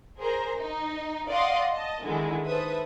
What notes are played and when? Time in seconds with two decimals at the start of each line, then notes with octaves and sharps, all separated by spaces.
0.19 G#4 A#4 C5 A#5
0.58 D#4
1.29 D5 D#5 F5 F#5 C6 D#6
1.72 D#5 A5
2.04 D3 D#3 G#3 E4
2.46 A4 B4 C5 E5 D#6